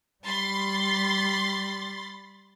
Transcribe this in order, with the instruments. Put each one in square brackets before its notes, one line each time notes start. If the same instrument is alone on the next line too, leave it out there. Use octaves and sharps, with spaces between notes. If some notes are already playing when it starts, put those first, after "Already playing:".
[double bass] G3 [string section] B5 C6 A6